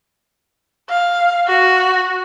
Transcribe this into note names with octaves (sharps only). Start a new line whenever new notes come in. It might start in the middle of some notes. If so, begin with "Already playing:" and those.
F5
F#4